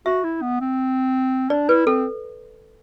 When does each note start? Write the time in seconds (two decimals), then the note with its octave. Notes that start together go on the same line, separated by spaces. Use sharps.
0.06 F#4 E5
0.24 E4
0.42 B3
0.61 C4
1.50 D4 D5
1.69 E4 B4
1.86 C4 A4